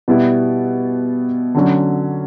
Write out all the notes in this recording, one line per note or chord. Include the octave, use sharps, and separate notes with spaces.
B2 G3 B3 E4
D3 F#3 C#4